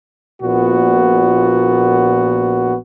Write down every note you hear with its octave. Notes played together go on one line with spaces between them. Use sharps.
A#1 A#2 B3 F#4